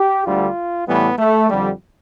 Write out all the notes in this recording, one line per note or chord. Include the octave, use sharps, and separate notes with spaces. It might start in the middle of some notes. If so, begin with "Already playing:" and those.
Already playing: G4
D2 D3 G3 F4
A2 E3 G3 B3
A3
F2 D3 G3